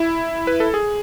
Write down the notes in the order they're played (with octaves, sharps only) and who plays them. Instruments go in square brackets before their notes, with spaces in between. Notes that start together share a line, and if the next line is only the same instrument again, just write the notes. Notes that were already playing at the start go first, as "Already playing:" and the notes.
Already playing: [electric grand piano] E4
B4
A4
G#4